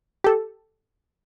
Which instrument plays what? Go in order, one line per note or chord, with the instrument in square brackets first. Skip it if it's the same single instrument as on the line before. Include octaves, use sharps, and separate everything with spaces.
[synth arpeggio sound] G4 A4